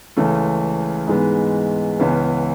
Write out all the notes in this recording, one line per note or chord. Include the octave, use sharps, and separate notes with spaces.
C#2 C#3 E3 A3
G#2 E3 G#3 B3
C#2 C#3 E3 B3